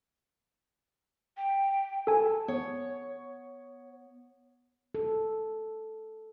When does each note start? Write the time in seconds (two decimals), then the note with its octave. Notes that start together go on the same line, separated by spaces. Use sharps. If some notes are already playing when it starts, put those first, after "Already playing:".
1.37 G5
2.07 A4 G#5 A5
2.48 B3 C#5
4.95 A4